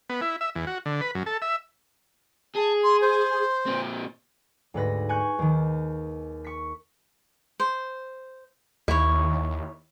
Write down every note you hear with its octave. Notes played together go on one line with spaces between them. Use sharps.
B3
E4
E5
E2
F#4
D3
B4
F#2
A4
E5
G#4 A5
C6
C5
A#2 C4
D2 G#2 B4 A#6
G#5 C#6 F#6 G6
D#2 D#3
C#6 B6
C5
D#2 E4 C#5